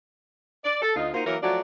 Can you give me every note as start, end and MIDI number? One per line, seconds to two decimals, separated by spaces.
0.65 0.78 74
0.82 0.94 69
0.96 1.14 38
0.96 1.14 63
0.96 1.14 65
1.14 1.24 58
1.14 1.24 63
1.14 1.24 65
1.14 1.24 66
1.14 1.24 70
1.14 1.24 72
1.26 1.37 52
1.26 1.37 54
1.26 1.37 58
1.26 1.37 64
1.26 1.37 70
1.26 1.37 73
1.43 1.61 53
1.43 1.61 54
1.43 1.61 57
1.43 1.61 66
1.43 1.61 74